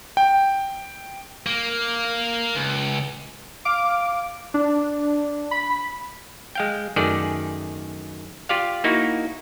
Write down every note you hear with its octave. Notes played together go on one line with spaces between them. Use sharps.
G5
A#3
C#2
F5 D6
D4
B5
G#3 F5 G5
F#2 D#3 A3 G#4 D5
F4 G4 D5 F5
A#3 D#4 E4 F#4